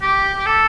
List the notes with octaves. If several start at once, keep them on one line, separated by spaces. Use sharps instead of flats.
G4
G4
A4